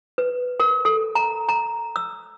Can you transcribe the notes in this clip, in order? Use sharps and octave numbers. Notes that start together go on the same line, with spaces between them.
B4
A#4
A4
A#5
A#5
E6